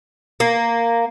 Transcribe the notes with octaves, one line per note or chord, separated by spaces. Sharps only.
A#3